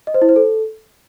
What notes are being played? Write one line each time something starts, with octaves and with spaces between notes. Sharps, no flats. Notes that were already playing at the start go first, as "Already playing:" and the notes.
D#5
C5
E4
C5
A4